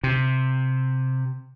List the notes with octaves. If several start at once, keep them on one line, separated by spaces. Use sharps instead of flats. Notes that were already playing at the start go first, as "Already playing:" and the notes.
C3